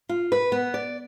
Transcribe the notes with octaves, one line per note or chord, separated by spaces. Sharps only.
F4
B4
B3
D5